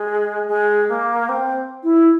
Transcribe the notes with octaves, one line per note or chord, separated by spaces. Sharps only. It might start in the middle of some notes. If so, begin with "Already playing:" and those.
Already playing: G#3
G#3
A#3
C4
E4